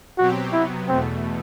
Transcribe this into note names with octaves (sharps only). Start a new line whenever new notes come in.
B2 F#3 C4 F#4 G4
C3 F#3 B3 E4
E2 B2 A3 C4